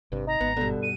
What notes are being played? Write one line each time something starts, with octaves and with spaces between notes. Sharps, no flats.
G#1 G2 C3
D#4 A#5
G#1 B3
G2 B2 D3
D#7